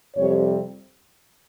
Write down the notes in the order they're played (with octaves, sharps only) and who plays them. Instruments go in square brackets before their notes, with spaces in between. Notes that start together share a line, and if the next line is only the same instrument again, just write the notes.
[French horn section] F2 C3 G3 C#5